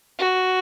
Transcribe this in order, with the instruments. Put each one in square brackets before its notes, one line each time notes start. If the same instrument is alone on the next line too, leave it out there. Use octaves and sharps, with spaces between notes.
[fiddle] F#4